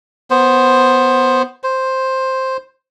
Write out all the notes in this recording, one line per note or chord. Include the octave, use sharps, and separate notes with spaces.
B3 C5
C5